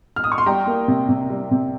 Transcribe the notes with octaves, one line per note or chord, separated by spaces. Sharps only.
F6
D#6
C#6
C6
G3 G5 A#5
A#3
C3
C3
G3
C3